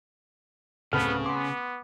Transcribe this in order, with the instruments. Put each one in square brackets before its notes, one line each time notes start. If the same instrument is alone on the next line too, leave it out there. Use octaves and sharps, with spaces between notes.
[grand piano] D1 A4 B4 [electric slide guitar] C#3 [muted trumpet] B3 [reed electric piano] F6
[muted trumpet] B3 [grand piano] C6 [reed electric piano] D6